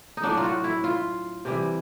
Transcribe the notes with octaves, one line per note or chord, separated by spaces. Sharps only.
D#4
A2 F#3 D4
F4
F#4
E4
F4
C3 E3 G3